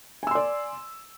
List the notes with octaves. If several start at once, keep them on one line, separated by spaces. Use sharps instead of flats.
D5 G#5 C6 E6